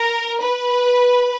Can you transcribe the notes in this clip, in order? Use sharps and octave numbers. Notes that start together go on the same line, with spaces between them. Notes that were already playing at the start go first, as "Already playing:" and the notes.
Already playing: A#4
B4